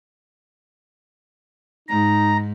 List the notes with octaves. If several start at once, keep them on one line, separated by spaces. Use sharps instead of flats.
G#2 D#4 A#5